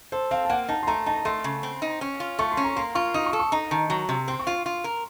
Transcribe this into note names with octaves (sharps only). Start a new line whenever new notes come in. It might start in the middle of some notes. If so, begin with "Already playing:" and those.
A4 C5
C4 F5
A5
A#3 F#5
D#4 A5
C6
A3 A#5
D#4 A5
A3 C6
C#3
C4
D#4
C#4
F4
A3 C#6
C6
C#4
A#5
A#3 C6
F4 C#6
D#4 D#6
C#6
A4
C#6
D#4 A#5
D#3 A5
F#3 A#5
C3
C4 C6
C#6
F4 C6
F4
A#4